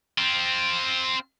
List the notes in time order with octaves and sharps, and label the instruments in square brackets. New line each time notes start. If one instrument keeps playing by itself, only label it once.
[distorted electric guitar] C4 F4